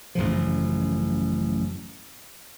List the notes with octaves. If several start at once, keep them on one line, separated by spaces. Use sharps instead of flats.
A1 F#2 C#3 F3